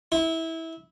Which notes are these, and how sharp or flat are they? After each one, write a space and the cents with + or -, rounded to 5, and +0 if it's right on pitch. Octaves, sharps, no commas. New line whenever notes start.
E4 -20